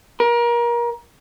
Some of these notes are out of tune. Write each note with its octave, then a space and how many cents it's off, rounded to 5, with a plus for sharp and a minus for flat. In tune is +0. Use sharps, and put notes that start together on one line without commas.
A#4 +30